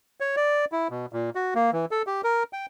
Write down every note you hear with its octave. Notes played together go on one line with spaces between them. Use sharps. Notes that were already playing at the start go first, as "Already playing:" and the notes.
C#5
D5
E4
B2
A#2
F#4
A#3
E3
A4
G4
A#4
G5